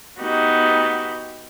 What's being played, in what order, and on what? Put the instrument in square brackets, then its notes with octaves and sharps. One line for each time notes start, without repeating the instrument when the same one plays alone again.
[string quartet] B3 D#4 F#4 G4